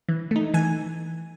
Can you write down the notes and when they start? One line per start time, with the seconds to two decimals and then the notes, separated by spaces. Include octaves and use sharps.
0.09 E3
0.31 A3 D#4
0.54 E3 G#5